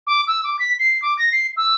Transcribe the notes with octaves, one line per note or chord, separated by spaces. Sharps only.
D6
E6
D6
B6
C7
D6
A#6
C7
E6